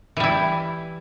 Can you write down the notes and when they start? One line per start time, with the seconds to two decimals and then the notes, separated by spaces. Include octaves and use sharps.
0.17 E3
0.20 G3
0.24 E4